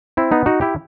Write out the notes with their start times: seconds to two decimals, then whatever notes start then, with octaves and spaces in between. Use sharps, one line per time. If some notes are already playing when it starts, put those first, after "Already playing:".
0.17 C4 E4
0.32 B3 D#4
0.46 D#4 F#4
0.61 E4 G4